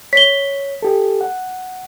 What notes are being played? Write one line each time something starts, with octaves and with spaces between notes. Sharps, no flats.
C#5 B6 G7
G4 A4
F#5